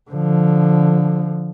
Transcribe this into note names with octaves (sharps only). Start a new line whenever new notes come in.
D3 F3